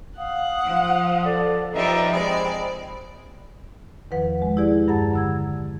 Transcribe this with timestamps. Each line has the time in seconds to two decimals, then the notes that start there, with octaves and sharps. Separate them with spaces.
0.18 F5 F#5 D#6
0.64 F3
1.24 A4 D5
1.74 F3 G3 D#4 B4 D#5 E5 A#5
2.11 G#3 C4 D5 B5
4.11 E2 D#3 F3 B4 F#5
4.42 G#3
4.57 E4 G4 G#4 D5
4.88 G2 G#4 F#5 A5 A#5 A6
5.13 D3 E6 G#6